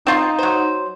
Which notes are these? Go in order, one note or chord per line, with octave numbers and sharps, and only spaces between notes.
C4 D#4 F4
F#3 C5